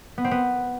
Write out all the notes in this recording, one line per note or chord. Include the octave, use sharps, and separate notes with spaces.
B3
C4
B3